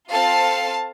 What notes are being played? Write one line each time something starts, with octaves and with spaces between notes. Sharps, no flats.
C4 F4 A4 F5 A5